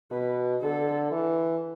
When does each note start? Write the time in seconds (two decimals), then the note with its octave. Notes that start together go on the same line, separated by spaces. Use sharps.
0.11 B2 B4
0.61 D3 A4
1.11 E3